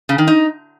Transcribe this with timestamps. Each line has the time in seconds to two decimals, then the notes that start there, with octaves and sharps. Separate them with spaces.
0.09 C#3
0.18 D#3
0.27 D#4